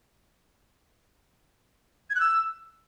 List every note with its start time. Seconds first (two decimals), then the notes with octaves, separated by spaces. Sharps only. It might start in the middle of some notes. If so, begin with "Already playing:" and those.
2.10 G#6
2.15 F#6
2.20 E6